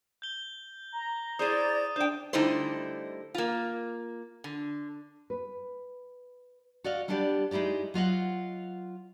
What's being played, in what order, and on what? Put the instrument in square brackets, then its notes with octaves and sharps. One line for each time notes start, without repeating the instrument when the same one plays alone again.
[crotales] G6 G7
[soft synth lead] A#5
[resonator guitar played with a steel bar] E4 G#4 C5 [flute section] D5 [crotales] D#6 D#7 E7
[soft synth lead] D4 [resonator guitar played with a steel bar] C5 G5 [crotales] G6
[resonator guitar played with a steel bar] D3 G3 A3 D#4 E4 C5
A#3 F4
D3
[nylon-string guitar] B4
F#4 D5 D#5 F5
G3 B3 D4 G4 D5
G#3 D#4 E4 G4 D5
F#3 F4 D#5 F#5